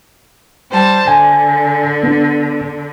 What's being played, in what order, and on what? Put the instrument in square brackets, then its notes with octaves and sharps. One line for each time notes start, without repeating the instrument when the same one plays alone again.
[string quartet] G3 C5 A5
[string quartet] D3 [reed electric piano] G#5
[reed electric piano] B3 D4